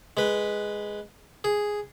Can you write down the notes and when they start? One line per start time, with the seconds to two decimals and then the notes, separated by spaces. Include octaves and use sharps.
0.17 G#3 B4
1.44 G#4